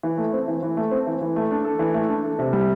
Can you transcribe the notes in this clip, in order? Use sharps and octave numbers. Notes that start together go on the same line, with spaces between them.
E3
A3
C4
E3
E3
A3
C4
E3
E3
A3
D4
A4
E3
A3
D4
A4
C3
G3